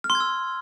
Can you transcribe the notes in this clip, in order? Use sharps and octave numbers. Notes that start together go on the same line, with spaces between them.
F6
C6
G#6
E6